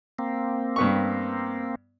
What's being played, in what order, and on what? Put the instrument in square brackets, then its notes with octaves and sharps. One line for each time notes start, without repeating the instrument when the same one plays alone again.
[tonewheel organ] A#3 C4
[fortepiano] G2 B3 C#6